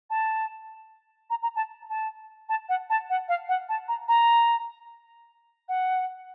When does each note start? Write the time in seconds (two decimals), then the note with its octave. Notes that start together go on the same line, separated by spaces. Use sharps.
0.10 A5
1.30 A#5
1.43 A#5
1.56 A5
1.90 A5
2.49 A5
2.69 F#5
2.90 A5
3.10 F#5
3.29 F5
3.49 F#5
3.69 A5
3.88 A#5
4.08 A#5
5.69 F#5